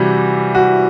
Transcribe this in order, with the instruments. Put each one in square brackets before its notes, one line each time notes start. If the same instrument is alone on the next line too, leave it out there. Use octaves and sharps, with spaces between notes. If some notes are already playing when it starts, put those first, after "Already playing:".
Already playing: [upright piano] C3 E3 G3 F#4
F#4